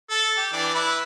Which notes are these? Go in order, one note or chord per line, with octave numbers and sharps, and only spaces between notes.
A4
G4
E3 D4 D5
E4 B4